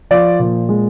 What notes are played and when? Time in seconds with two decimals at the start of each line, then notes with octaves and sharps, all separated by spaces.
0.11 F3 D5
0.39 A#2
0.69 G#3